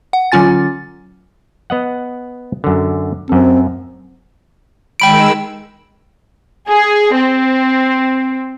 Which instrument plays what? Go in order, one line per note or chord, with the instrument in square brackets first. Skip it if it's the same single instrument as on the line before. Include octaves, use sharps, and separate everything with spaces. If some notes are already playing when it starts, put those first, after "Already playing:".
[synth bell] F#5
D3 F#3 C#4 F4 G#5 A6
[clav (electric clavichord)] B3 D#5 F#5
F#2 D3
[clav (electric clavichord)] F#2 A4 [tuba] C4
[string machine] D#3 G#3 E6 [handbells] G5 B5 D7
[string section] G#4
C4